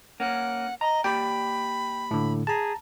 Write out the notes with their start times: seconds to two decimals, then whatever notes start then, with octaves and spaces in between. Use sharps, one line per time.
0.20 A#3 C#4 F#5
0.81 D#5 A#5
1.04 A#3 G4 D5 G5 B5
2.11 A2 D3
2.47 G#4 A5 A#5